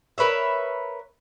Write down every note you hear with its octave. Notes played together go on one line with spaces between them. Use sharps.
A#4 B4 C#5 E5